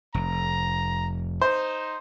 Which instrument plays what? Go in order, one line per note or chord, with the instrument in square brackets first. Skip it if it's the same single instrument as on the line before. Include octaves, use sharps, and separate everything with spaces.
[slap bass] F1 [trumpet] A#5
[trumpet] D#4 [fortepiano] C5